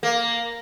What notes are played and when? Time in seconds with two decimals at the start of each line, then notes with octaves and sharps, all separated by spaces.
0.03 A#3